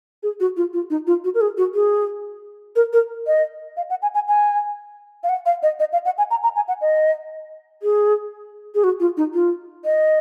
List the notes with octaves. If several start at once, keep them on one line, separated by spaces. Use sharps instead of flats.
G#4
F#4
F4
F4
D#4
F4
F#4
A#4
G#4
F#4
G#4
A#4
A#4
D#5
F5
F#5
G#5
G#5
G#5
F5
F#5
F5
D#5
D#5
F5
F#5
G#5
A#5
A#5
G#5
F#5
D#5
G#4
G#4
F#4
F4
D#4
F4
D#5